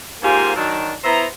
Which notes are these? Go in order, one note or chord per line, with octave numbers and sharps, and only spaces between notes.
G#2 A#3 F4 G4 C5 G#5
D#3 F#3 D4
B3 E4 C5 E5 A#5